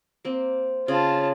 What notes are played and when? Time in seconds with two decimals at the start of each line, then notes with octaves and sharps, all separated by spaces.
0.25 A#3 C4
0.88 C#3 F4 A5